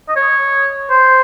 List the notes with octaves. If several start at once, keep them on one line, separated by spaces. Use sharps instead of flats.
D#5
C#5
C5